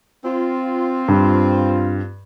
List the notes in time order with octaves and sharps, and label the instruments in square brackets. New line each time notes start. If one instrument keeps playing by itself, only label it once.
[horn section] C4 F4
[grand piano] G2